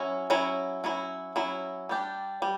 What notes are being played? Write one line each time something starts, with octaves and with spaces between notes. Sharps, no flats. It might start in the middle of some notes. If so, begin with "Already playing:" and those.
Already playing: F#3 C#4 E4
F#3 C#4 E4
F#3 C#4 E4
F#3 C#4 E4
G3 D4 G4
G3